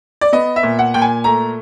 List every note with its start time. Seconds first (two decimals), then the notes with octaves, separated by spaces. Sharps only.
0.21 D5
0.33 B3 D#5
0.56 E5
0.63 A#2
0.79 F#5
0.94 A#2 G5
1.02 G#5
1.24 A3 A#5